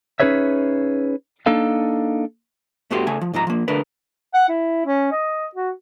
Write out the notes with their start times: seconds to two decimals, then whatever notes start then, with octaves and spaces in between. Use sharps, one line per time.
0.20 C#4 D#4 G#4 B4 C#5 E5
1.46 A#3 D4 D#4 A4 F5
2.91 G2 A3 B3 F#4 G4 C6
3.07 C#3 A3 G#5
3.21 F3
3.33 C2 G#2 F3 A#5
3.47 F3 A#3
3.68 D3 A3 D4 A#4 B4
4.34 F#5
4.49 E4
4.86 C#4
5.12 D#5
5.55 F#4